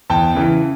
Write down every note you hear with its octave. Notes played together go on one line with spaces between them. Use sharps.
E2 G5 A5
C#3 E3